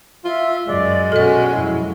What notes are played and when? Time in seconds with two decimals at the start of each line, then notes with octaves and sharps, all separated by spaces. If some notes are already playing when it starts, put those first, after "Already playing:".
0.25 F4 E5
0.67 F#2 G#3 D5
1.12 B2 C#4 F#4 A4 D#5
1.53 F2 F#3 E4